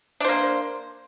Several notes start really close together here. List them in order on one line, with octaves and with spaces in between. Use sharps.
D4 C5 A#3